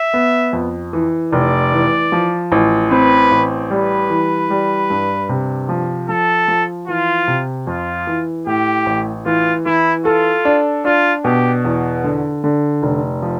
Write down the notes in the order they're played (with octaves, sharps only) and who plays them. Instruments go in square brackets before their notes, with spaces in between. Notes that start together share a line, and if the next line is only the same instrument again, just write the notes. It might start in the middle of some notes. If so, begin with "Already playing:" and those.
Already playing: [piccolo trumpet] E5
[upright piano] B3
F2
E3
[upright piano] F1 [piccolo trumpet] D5
[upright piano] E3
F3
A1
[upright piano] C4 [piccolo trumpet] B4
[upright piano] A1
[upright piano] G3 [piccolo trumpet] B4
[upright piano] E3
G3
G2
C3
F3
[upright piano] F3 [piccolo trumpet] A4
[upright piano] F3
[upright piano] E3 [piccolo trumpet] F4
[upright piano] C3
[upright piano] F2 [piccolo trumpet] F4
[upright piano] E3
[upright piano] A2 [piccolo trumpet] G4
[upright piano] A1
[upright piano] E3 [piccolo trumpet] F4
[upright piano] E3 [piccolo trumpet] E4
[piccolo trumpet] F4 [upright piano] A4
[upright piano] D4
[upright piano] D4 [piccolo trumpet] F4
[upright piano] B2 [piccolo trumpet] G4
[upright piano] E2
D3
D3
F1
F3